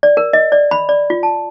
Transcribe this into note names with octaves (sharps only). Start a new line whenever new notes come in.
D5
A#4
D#5
D5
B5
D5
F4
A5